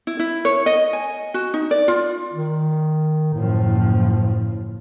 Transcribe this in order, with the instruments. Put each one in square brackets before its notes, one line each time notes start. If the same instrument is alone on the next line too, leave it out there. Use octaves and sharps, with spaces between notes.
[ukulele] E4
E4
C#5
D#5
G#5
F#4
D#4
D5
F4
[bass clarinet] D#3
[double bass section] F#1 F3 [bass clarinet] A2